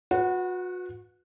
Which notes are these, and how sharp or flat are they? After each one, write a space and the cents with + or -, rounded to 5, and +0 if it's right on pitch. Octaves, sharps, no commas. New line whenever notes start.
F#4 -35 B4 +0 F#5 +0